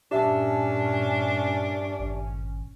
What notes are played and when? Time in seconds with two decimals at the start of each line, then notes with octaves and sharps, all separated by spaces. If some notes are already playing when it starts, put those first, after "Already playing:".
0.11 G2 A#2 C#4 D4 G4 E5 A5
2.00 G#1